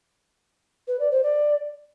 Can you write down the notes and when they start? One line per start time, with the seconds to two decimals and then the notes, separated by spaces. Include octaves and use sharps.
0.88 B4
1.00 D5
1.11 C5
1.23 D5